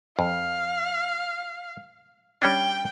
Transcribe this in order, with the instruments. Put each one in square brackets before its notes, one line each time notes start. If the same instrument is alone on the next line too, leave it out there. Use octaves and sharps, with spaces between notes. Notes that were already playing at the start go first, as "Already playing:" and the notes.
[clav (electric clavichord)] F2 [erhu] F5
[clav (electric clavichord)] G3 C#4 D4 [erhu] G5